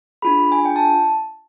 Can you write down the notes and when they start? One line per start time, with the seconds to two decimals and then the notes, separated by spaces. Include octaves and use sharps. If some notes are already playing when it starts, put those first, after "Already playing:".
0.22 D4 F4 G#4 B5
0.52 G#5
0.65 G5
0.76 A5